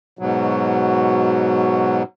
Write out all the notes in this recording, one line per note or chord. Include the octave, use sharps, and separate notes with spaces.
G#2 B2 F#3